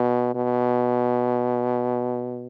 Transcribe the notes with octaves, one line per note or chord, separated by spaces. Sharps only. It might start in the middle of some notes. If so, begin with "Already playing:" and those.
Already playing: B2
B2